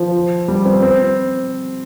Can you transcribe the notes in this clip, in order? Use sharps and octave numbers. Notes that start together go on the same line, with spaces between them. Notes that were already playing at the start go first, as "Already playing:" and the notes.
Already playing: F3
G3
C4
C4